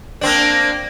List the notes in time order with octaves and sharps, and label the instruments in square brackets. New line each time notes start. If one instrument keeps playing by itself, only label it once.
[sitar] A#3 C4 D4